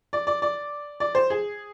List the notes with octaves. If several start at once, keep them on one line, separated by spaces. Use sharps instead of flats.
D5
D5
D5
D5
C5
G#4